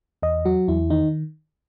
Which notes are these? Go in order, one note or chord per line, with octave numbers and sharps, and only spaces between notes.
E2 D#5
F#3 F#4
E2 E4
D#3 D#4